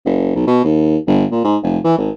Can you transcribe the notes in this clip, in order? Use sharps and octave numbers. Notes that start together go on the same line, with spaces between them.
F#1
B1
B2
D#2
G1
A#2
G#2
F1
E3
G#1